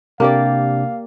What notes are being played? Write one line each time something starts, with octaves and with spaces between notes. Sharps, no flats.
C3 A#3 D4 G4 D5 F5